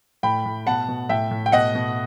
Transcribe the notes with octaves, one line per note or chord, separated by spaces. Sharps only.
A2 G5 B5
A2
B2 F#5 A5
B2
A2 E5 G5
A2
G5
B2 D#5 F#5
B2